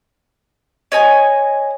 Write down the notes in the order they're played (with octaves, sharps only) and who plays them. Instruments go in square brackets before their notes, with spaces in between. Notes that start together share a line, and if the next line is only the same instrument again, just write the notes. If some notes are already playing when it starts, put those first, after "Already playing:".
[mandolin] C#5 D#5 G#5